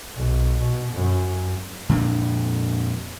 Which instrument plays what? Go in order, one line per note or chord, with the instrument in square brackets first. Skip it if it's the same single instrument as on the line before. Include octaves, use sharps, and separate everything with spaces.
[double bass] B1
B2
F#2
[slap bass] F2 A#2 D4